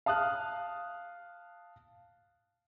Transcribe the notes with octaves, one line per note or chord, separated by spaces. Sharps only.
F5 A5 D#6 F6 F#6